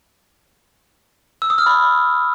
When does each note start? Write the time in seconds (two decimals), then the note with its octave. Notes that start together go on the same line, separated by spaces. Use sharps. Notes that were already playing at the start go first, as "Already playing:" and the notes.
1.42 E6
1.50 D#6
1.58 F6
1.66 B5